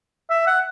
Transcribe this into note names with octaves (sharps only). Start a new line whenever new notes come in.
E5
F#5